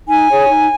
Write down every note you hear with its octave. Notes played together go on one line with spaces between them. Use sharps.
D#4 G#5
G#4 C#5
D#4